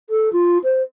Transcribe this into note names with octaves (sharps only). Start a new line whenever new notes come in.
A4
F4
C5